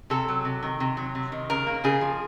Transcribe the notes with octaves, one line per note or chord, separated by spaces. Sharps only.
C3 A4
F#3
C3
D#3
C3
F#3
C3
D#3
C#3 A#4
A#3
C#3 G#4
F3